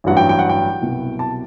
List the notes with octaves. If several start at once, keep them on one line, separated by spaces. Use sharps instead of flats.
A1 G2 F#3 F#5
G5
G5
F#5
G5
C2 B2 F#3
A5